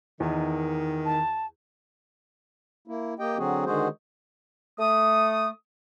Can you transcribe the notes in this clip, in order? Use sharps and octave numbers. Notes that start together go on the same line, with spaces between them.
E2 D#3
A5
A#3 E4
A#3 G4 D#5 G5
D3 F#3 C4 F#4 G#4
D3 D#3 G#3 F#4 G#4 C5
A3 D#6